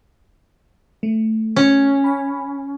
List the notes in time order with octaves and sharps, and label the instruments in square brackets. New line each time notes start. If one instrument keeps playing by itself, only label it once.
[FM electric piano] A3
[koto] C#4
[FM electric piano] G#5 B5